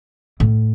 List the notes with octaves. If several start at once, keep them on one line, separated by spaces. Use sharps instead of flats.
A2